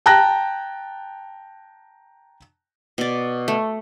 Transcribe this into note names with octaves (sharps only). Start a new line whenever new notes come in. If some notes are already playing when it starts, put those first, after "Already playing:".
G5 A5 A#5 F#6 A#6
B2 D5
A3